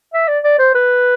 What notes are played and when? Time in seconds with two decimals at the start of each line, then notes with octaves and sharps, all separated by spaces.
0.13 E5
0.28 D5
0.44 D5
0.59 C5
0.74 B4